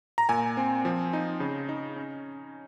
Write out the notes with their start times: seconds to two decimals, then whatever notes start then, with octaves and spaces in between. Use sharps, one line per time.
0.18 A#5
0.29 A#2 G#5
0.57 C4
0.85 F3
1.13 D#4
1.40 C#3
1.69 D#4
1.96 C#4